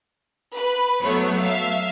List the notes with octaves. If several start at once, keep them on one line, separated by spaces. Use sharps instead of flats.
B4
F#3 A3 B3 C#5
E5 F5